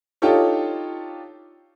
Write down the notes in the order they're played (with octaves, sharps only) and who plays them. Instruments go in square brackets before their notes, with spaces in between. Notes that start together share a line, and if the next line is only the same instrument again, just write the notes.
[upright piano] D4 D#4 F4 G4 A4 C#5